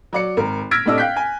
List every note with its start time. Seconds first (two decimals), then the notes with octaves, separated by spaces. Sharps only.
0.13 F#3 D5 C#7
0.37 G#1 A#4
0.71 E6 F6 G#6 A#6 B6 D7
0.86 A2 C3 A3 D4 D#5 E6
0.98 F5 G5 F#6 G6 B6
1.16 G#5